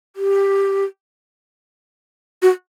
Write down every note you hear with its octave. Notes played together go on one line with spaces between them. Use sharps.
G4
F#4